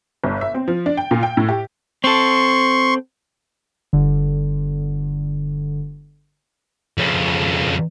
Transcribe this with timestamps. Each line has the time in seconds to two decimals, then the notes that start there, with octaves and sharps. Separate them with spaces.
0.24 G1
0.41 E5
0.54 C4
0.68 F3
0.86 D4
0.97 G5
1.11 A#2
1.23 G5
1.37 A2
1.49 G4
2.04 C4 A4 C6 C#6
3.93 G1 D3
6.98 F2 C#3